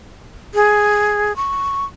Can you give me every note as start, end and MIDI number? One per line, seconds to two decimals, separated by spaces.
0.54 1.35 68
1.36 1.85 85